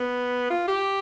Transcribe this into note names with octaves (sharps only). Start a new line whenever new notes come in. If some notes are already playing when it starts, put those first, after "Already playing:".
Already playing: B3
F4
G4